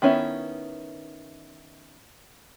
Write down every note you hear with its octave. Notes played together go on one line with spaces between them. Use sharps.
D#3 B3 C#4 D#4 E4